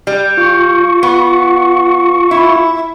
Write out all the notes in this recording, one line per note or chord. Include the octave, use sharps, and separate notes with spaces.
G3
F4 C#6
B3
E4